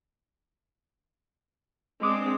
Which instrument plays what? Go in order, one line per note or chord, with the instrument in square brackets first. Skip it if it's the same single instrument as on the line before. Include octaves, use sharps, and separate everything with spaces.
[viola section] G#3 C4 D4 [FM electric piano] D6 D#6